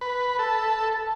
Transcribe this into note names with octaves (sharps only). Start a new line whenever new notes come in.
B4
A4